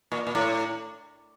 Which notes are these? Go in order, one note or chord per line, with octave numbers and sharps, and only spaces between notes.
A#2
A#2
A2